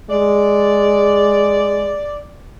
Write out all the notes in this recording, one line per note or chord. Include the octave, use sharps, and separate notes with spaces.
G#3 D5